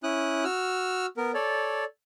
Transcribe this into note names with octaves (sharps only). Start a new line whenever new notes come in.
C#4 E4 D#6 F#6
F#4 E6 F6
B3 A#4
A4 C#5 D5